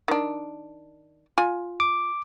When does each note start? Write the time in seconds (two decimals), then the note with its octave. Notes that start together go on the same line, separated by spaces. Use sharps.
0.08 D#3 D4
1.38 F4 G#5
1.80 D6